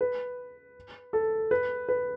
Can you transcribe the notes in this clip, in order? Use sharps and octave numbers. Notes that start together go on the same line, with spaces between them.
B4
A4
B4
B4